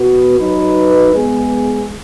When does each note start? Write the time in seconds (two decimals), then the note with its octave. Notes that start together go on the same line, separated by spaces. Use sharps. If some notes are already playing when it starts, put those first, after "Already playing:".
Already playing: B2 B3 F#4 B4
0.38 F#3 D#4 B4
1.13 G#3 B3 G#4